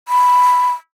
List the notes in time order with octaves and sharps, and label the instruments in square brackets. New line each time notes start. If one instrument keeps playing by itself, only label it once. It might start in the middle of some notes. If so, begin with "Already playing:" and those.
[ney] B5